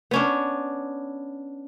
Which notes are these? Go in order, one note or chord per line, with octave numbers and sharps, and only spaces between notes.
B3 C#4 D4